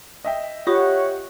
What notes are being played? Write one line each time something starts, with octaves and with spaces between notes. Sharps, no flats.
D#5 E5 G5
F4 G4 C#5 F#5 C#6 D#6